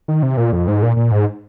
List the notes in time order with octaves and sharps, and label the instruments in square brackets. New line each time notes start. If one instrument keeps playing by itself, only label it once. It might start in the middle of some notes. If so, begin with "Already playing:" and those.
[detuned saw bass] D#3
C3
A#2
F2
G#2
A#2
A#2
G#2